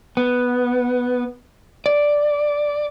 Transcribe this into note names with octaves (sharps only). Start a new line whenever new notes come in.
B3
D5